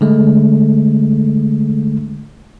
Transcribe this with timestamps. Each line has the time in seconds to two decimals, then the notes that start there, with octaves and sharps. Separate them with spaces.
0.01 D3 G#3 A3